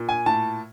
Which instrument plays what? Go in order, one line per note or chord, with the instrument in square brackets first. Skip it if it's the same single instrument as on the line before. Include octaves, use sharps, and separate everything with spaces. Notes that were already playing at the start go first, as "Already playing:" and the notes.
Already playing: [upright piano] A#2
G#5
A2 A5